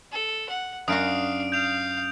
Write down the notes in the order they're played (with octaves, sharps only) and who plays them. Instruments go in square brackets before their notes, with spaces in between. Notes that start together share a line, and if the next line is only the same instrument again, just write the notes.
[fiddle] A4
F#5
[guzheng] F#2 F4 F#4 [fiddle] D4 F5 [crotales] D#6 D7
[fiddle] F5 [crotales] G6 F7